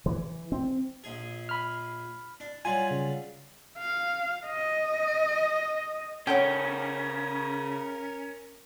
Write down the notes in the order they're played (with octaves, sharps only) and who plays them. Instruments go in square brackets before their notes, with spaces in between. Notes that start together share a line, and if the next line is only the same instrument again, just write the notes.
[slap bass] E3
C4
[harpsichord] A#1 G#4
[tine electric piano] B5 F6
[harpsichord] D4
[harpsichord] F#3 G3 F4 [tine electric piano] G#5
[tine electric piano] C#3
[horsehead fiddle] F5
D#5
[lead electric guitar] C#3 A4 [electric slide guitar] C#4 [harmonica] A#4 [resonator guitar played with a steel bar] C#5 F#5 G5